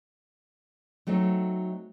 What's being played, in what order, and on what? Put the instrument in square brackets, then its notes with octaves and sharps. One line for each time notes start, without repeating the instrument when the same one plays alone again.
[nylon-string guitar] F#3 A3 C4 D#4